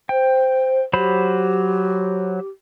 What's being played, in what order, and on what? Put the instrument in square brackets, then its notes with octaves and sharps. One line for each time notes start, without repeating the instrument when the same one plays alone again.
[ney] C5 [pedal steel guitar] G5
[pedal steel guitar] F#3 C5 B5 [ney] G4